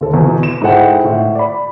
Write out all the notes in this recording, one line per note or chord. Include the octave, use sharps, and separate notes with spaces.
D#2 A4
E2 B2
E7
G#2 G#3 E4 A4 F#5 G5
A2
D5 B5